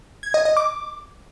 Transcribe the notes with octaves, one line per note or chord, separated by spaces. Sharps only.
G#6
D#5
D#5
D6